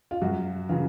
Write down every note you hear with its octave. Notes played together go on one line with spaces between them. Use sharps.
F4
F#2 F#4
C#3 E3 F4